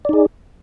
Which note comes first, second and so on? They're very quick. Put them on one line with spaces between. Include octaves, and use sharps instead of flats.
D5 D#4 G#4